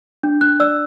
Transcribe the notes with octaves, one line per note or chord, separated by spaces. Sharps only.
D4
D4 F#6
D5 E6